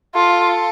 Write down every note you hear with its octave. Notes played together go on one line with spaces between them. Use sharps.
F4 A4